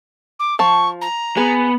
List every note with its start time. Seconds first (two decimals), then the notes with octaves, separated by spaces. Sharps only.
0.40 D6
0.59 F3 A5 C#6
1.02 A#5
1.37 B3 G#4